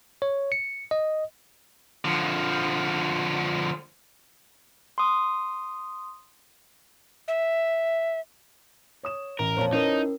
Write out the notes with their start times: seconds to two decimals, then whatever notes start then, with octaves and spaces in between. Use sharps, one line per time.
0.22 C#5
0.52 C#7
0.91 D#5
2.05 D3 F3
4.98 C6 D#6
7.28 E5
9.03 C#5 D#6 E7
9.39 A1 A#4
9.57 F2 A#2 C5 C#5 A5
9.73 C#4 D#4 E4 A#4 B4